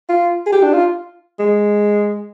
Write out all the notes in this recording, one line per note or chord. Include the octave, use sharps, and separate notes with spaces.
F4
G#4
G4
D4
F4
G#3